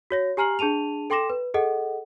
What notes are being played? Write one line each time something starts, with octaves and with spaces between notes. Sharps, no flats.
F#4 C#5 A#6
G4 G#5 A#5 F6 C7 F#7
D4 G#4 A5 D#7 F7
A4 G5 C6 D6 A#6 E7
B4
G#4 A4 D#5 F#5